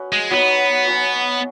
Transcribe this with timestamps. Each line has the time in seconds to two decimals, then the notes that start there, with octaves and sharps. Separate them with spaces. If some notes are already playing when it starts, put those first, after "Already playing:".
Already playing: C#4 F#4 B4 D#5
0.12 G#3
0.31 F#3 B3 D#4 F#4 B4
0.87 F#3 C#4 F#4